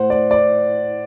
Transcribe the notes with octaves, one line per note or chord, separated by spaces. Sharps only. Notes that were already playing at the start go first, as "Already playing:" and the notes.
Already playing: A2 C5 F#5
D5
D5